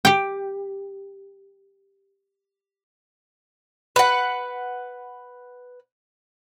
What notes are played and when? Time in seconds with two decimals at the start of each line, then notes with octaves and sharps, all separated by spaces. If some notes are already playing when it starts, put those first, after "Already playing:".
0.05 G4 G5
3.96 B4 F#5